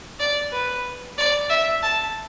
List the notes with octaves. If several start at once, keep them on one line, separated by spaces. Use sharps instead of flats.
D5
B4
D5
E5
A5